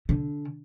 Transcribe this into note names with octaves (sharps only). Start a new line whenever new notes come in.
D3